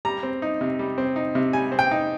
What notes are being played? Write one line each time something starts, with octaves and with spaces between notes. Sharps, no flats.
G3 A#5
C4
D#4
C3
G3
C4
D#4
C3
G3 G#5
C4
G5
D#4